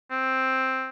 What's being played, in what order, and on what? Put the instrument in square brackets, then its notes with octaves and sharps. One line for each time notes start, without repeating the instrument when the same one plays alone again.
[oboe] C4